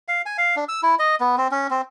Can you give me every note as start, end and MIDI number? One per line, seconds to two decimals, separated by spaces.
0.08 0.22 77
0.26 0.37 80
0.38 0.55 77
0.56 0.64 62
0.68 0.81 88
0.83 0.95 64
0.99 1.15 75
1.20 1.36 59
1.38 1.48 60
1.51 1.67 61
1.71 1.81 60